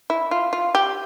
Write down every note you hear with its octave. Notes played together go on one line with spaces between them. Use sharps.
E4
F4
F4
G4